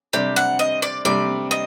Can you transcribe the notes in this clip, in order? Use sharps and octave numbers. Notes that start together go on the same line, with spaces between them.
C3 G3 D4 G4
F#5
D#5
D5
C3 G3 D4 D5
D#5